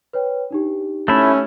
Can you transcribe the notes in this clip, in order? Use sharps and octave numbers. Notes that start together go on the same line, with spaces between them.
B4 C#5 G5
D4 D#4 G4
A3 C#4 E4